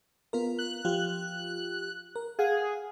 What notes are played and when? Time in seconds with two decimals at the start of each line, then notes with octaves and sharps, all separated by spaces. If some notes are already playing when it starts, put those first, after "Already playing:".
0.33 B3 F4 A#4
0.59 F#6
0.85 F3 F4 G4
2.16 A#4
2.39 G#4 F5 F#5